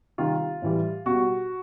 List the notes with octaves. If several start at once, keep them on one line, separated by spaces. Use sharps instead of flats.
C3 D#3 G3 F4
A2 E3 G3
B2 G3 F#4